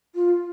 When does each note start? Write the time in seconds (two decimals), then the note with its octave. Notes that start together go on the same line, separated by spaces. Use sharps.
0.15 F4